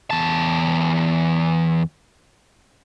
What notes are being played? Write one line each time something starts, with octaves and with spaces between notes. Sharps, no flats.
E2 A5